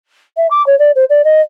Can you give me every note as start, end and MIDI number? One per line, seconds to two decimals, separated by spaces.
0.37 0.47 76
0.51 0.65 86
0.67 0.78 73
0.79 0.92 74
0.96 1.05 72
1.10 1.24 74
1.25 1.41 75